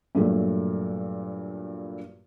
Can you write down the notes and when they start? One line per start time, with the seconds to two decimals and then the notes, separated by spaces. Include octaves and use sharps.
0.15 G2 A#2 F#3 A3